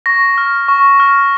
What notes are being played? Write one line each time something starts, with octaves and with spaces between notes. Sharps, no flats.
C#6 A#6
F6
C#6
F6